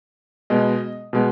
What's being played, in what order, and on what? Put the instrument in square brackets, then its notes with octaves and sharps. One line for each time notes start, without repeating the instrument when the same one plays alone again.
[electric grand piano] B2 G#3 B3 D#5
B2 G#3 B3